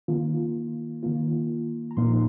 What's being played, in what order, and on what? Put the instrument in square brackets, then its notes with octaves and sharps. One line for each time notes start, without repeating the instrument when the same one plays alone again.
[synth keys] D#3 A#3 F4
D#3 A#3 F4
A#5
A#2 F3 A#3 D#4 C6